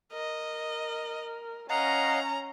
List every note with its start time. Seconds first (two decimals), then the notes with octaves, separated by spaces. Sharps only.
0.13 A#4 D#5
1.70 C#4 D#5 F5 F#5 A#5